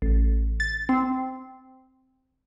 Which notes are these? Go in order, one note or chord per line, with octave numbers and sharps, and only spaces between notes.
A1
A6
C4